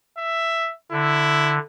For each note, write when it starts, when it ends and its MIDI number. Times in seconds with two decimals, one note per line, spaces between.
0.18 0.72 76
0.92 1.59 50
0.92 1.59 64